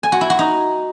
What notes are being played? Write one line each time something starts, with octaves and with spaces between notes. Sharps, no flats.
G#5
F#4
E4
F#4
D#4